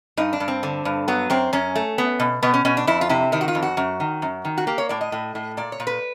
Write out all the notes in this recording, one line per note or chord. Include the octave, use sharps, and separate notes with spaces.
G2 D#4
D4
G2
C4
D3
G2
F#3 B3
F#2 C4
F#2 C#4
A3
B3
B2
B2 B3
C#4
B2 C#4
D4
F2 E4
F4
C3 E4
D#3 E4
F#4
F4
F2
F#4
F#2
D#3
F#2
D#3
F#4
A#3 G4
C#5
A2 D5
D#5
A2
A2
A#2 D5
C#5
A#2
B4